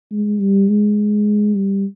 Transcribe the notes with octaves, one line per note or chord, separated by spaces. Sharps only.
G#3
G3
G#3
G3